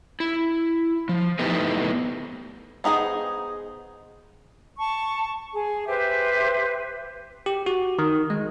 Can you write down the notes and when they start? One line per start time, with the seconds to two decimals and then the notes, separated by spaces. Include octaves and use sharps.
0.20 E4
1.09 F3
1.39 A3 B3 D#4 E4 G4 B4
2.84 B3 D#4 F#4 G#4 C5
4.78 A5 C#6
5.54 G#4
5.87 G4 B4 C5 E5
7.46 G4
7.66 F#4
7.99 D#3
8.30 G#3